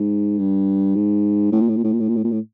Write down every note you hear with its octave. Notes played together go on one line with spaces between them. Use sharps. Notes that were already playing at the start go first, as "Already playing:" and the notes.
Already playing: G#2
G2
G#2
A2
A#2
A2
A#2
A2
A#2
A2
A#2
A2
A#2
A2